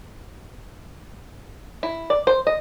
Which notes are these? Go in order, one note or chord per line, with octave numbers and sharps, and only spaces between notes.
E4
D5
C5
D#5